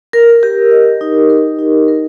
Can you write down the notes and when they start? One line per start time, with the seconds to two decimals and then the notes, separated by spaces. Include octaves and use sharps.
0.13 A#4
0.43 G4
0.71 D#5
1.01 D#4
1.30 A#4
1.59 D#4
1.88 A#4